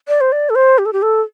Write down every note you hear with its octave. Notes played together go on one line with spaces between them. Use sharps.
D5
C5
D5
A4
C5
G4
A4
G4
A4